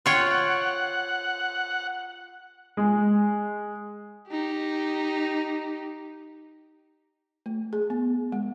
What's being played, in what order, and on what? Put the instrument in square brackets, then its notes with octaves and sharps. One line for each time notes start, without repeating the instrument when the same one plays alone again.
[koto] F4 C#5 G5 [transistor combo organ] F#5
[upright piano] G#3
[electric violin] D#4 G4
[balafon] A3
G#4
B3
G#3